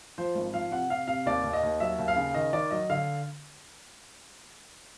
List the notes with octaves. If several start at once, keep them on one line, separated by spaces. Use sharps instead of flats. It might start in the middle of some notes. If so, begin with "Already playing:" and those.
F3 C5
G#1
F3 F5
C3 F#5
C3 F5
C3 F5
D#2 D5
D#2
D#5
D#2
F#3 E5
D#2
F5
C#3
D#3 D#5
D#3 D5
F#3 D#5
D3 F5